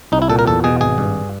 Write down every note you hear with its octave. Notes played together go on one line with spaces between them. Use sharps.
C2 D#4
E4
A#2 A4
A#4
E2 A4
B2 G#4
G#1 G#4
G2